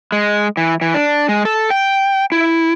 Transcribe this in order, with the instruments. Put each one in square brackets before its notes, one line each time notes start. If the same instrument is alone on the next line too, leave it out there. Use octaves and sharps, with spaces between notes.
[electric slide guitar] G#3
E3
E3
D4
G#3
A4
G5
E4